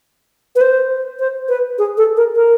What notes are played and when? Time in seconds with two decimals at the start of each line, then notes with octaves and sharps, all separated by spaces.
0.56 B4
0.61 C5
1.20 C5
1.49 B4
1.78 G#4
1.97 A4
2.17 A#4
2.36 A#4